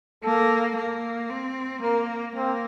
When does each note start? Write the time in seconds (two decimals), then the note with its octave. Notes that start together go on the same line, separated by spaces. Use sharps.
0.24 A#3 A4
0.76 A#3
1.30 C4
1.82 A#3 A#4
2.36 A#3 C4